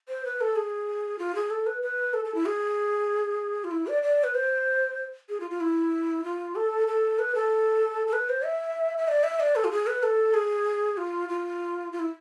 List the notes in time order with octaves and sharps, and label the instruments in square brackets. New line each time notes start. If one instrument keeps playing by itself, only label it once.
[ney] C5
B4
A4
G#4
F4
G#4
A4
B4
B4
A4
A4
E4
G#4
F4
E4
D5
D5
B4
C5
G#4
F4
F4
E4
F4
A4
A4
B4
A4
A4
B4
C5
E5
E5
D5
E5
D5
A4
F4
G#4
B4
A4
G#4
F4
F4
F4
E4